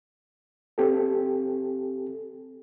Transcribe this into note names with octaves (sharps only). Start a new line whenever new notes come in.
C4 G4 A4